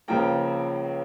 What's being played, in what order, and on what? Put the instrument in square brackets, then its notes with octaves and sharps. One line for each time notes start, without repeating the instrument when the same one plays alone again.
[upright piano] C#2 C#3 F3 A#3 G5 A#5